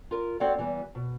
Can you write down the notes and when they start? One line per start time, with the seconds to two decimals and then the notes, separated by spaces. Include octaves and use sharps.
0.11 F4 A#4
0.40 C4 F#4 A4 C#5 D5 F#5
0.59 E3 G3 B3
0.95 B2